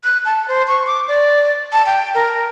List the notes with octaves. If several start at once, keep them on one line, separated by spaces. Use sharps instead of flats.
F#6
A5
C5
C#6
D6
D5
A5
G5
A#4